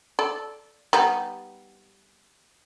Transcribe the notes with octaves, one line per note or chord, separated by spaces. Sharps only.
A4 D5
G3 B3 D#4